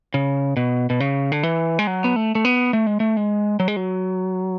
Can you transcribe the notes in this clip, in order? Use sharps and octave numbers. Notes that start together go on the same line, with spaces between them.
C#3
B2
B2
C#3
D3
E3
G#3
F#3
B3
A3
A3
B3
A3
G#3
A3
G#3
F#3
G#3
F#3